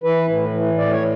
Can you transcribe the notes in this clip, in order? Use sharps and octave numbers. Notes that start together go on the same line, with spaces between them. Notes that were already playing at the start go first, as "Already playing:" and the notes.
E3 B4
A2
E3
A2 D5
C#5